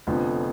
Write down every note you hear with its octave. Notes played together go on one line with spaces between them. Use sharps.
F1 F2 D3 F3 B3